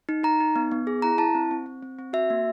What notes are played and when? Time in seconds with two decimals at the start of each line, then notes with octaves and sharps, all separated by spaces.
0.09 D#4
0.24 D#4 A#5
0.40 D#4
0.56 B3
0.72 B3
0.87 G#4
1.02 E4 A#5
1.18 E4 A5
1.35 C4
1.51 C4
1.66 C4
1.83 C4
1.99 C4
2.13 F#4 E5
2.30 A#3